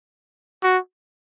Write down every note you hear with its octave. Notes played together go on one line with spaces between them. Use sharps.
F#4